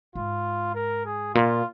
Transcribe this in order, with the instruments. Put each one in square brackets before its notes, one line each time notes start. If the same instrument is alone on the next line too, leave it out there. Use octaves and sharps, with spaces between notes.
[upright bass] G#2 [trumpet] F4
[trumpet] A#4
G#4
[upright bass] A#2 [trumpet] F4